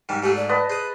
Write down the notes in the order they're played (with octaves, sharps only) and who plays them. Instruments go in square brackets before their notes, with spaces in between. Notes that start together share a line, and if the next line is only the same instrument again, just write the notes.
[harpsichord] G#2 D#3 G3
[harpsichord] G#2 A3 G#4 [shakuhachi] G4
[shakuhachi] D5
[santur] B4 D#5 A5
[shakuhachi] G#4 [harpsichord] C5 D#6